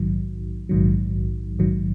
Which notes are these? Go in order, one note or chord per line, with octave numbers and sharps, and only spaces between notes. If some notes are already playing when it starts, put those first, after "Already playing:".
Already playing: A#1 G#2 D#3 F#3
A#1 G#2 D#3 F#3
A#1 G#2 D#3 F#3